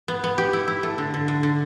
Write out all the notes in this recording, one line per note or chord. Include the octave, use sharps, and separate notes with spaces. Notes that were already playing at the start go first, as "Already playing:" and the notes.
B3
B3
G4
E4
E4
A3
D3
D3
D3
D3